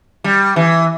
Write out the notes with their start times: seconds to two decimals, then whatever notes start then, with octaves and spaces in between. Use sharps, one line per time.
0.24 G3
0.56 E3